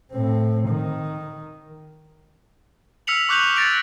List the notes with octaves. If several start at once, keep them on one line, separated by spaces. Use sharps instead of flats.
A2 C4
D#3
E6 F6 B6 C#7 F7 F#7
C#6 D6 F#6 G6 F7 F#7
A6 A#6 C#7 D7 F7 F#7